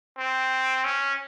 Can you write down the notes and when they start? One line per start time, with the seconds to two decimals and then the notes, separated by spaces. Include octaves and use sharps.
0.18 C4
0.85 C#4